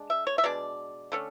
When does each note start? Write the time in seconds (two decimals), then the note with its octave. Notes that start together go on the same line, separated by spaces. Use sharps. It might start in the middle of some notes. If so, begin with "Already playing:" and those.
Already playing: G#3 D4
0.10 E5
0.27 C#5
0.38 E5
0.44 B2 G#3 D4 D5
1.12 D3 A3 C#4